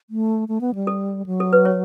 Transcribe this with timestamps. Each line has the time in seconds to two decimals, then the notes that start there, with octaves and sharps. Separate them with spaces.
0.10 A3
0.48 A3
0.61 B3
0.75 G3
0.87 A4
1.26 F#3
1.40 A4
1.53 B4
1.65 C#5